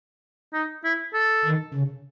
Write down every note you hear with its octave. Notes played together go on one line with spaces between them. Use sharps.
D#4
E4
A4
D#3
C#3